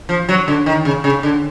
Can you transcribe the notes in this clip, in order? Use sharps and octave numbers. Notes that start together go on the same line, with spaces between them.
F3
F#3
D3
D#3
C#3
C#3
D3